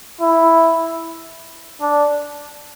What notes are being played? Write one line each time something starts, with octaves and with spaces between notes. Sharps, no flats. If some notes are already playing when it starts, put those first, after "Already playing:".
E4
D4